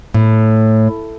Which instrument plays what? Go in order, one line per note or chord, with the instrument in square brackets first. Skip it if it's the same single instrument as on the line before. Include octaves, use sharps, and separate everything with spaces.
[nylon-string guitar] A2